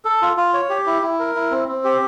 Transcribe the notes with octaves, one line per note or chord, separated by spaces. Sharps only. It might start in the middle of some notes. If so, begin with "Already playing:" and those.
A4
F4
F4
C#5
G4
E4
E4
A#4
E4
C4
C4
G4